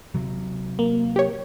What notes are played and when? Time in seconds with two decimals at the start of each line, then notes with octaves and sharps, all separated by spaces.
0.15 C3 F#3
0.79 A#3
1.16 G4 C#5